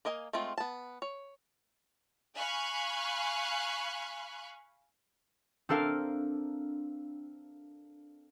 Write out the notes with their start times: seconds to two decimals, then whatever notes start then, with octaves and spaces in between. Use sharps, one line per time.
0.05 A#3 A#4 D#5 F5 G#5
0.33 G#3 A3 C4 F4
0.58 B3 A5
1.02 C#5
2.36 F5 G#5 B5 C#6 F#6
5.69 C4 D4 A4 A#4 F5